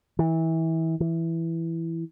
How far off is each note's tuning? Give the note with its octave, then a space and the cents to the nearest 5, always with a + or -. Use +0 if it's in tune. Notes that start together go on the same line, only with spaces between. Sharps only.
E3 -25
E3 +5